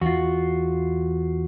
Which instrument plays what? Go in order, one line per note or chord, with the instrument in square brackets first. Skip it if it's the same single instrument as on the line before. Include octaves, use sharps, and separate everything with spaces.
[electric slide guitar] E2 F4 [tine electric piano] F#4